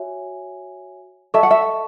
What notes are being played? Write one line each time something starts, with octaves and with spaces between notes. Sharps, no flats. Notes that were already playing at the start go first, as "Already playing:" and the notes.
Already playing: F#4 C#5 E5 G#5
A4 D#5 E5 A5 C#6
F#5
E5